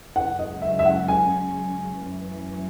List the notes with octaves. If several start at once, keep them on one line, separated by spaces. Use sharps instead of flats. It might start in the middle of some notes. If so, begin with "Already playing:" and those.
F#2 C#3 G#3 C#4 F#5
D#5
E5
E5
F#5
G#5
F#2 E3 A3 C#4